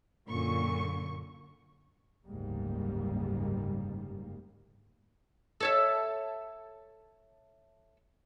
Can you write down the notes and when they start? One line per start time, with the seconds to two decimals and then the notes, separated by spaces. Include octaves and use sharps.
0.28 F#2 A#2 D3 A#3 C#6
2.25 F#1 D2 G#2 G3 A#3
5.60 A4 C#5 E5